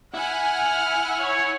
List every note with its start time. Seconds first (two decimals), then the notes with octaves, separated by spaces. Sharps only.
0.14 E4 F#5 G#5 F6
1.20 C#5 C#6